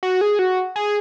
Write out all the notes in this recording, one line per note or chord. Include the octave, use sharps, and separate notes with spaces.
F#4
G#4
F#4
G#4